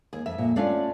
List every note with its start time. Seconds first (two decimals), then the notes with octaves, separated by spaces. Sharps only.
0.13 D#2 G#4
0.26 F2 E5
0.38 F2 A#2
0.56 A3 C#4 D4 F4 D5 F5